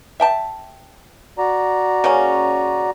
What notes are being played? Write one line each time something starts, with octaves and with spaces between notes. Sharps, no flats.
E5 G5 A5
F#4 D5 A#5
C#3 A#3 C#4